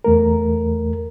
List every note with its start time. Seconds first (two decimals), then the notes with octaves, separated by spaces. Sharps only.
0.04 E2 A3 A#4